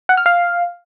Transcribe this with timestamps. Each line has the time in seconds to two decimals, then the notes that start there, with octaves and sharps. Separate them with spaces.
0.09 F#5
0.17 F6
0.26 F5